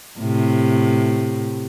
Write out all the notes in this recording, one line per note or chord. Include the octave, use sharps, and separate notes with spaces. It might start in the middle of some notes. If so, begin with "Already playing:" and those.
A2 C3